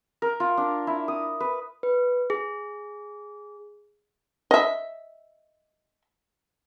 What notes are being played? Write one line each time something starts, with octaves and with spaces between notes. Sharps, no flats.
A#4
F4
D4
E4
D#6
B4
B4
G#4
D#5 E5